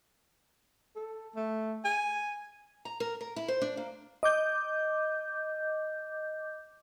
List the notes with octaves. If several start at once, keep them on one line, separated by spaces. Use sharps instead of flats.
A4
A3
G#5
A#5
A#4
A#4
E4
C5
D4
A#3
D#5 D6 G6